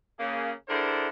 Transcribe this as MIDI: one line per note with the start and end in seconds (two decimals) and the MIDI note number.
0.19 0.51 49
0.19 0.51 58
0.19 0.51 68
0.68 1.07 50
0.68 1.07 62
0.68 1.07 64
0.68 1.07 68
0.68 1.07 70
0.68 1.07 72